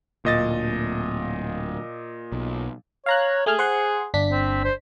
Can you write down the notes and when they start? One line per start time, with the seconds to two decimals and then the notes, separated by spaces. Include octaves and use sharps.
0.25 D1 A#2 D#5 A6
2.32 B1
3.06 C#5 F5 A#5 F#6
3.46 A3 G#4 G#5 F6
3.59 C5 F#5 C6
4.14 G1 D4 B6
4.31 C4
4.64 C5